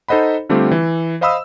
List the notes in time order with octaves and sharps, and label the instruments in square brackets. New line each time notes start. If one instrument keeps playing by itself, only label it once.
[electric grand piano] D#4 A4 C5 D#5 F#5 B5
D3 G3 A3 C4 F4 G4
E3
C5 D#5 F5 B5 D#6 E6